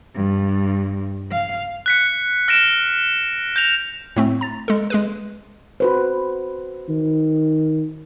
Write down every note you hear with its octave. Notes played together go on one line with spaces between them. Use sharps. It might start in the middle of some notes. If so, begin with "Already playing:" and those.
G2
F5
F#6 B6 C#7
F6 A#6 D7 E7
G6 A#6 F7
A2 A3 C4
A#5 A6
G#3 A4
G#3 G#4 B4
F#4 B4 C5
D#3